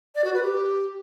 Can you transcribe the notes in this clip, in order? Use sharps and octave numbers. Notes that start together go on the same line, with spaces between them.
D5
F#4
B4
G4